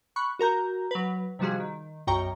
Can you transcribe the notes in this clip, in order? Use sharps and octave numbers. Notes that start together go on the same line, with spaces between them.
B5 C#6 F#6
F#4 A#4 A#5 G6
F#3 B4
C3 D#3 F3 G3 F#4 G#4
D#3
B1 F#2 C#5 G5 A#5 C#6